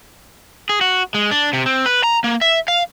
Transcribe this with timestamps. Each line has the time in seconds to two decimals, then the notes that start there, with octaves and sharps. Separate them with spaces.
0.69 G#4
0.81 F#4
1.14 G#3
1.31 D4
1.53 C3
1.66 C4
1.86 B4
2.04 A#5
2.24 A#3
2.41 E5
2.68 F5